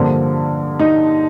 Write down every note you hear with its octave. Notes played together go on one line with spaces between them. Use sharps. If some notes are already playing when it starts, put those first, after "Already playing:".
Already playing: G2 D3 F3 A#3
D#4